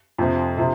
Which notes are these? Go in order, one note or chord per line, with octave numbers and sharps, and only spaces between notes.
F2 C3 F3
C3 F3